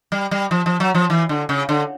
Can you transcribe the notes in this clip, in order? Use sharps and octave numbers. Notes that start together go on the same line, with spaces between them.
G3
G3
F3
F3
F#3
F3
E3
D3
C#3
D3